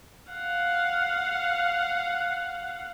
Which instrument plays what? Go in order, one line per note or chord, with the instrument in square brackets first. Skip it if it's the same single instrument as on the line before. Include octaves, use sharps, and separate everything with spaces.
[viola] F5 F#5